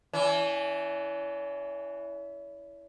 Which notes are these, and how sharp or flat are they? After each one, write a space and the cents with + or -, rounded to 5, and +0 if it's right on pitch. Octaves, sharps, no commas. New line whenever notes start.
E3 +0 C#4 +40